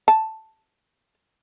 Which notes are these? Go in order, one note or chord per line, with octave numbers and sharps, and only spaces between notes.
A5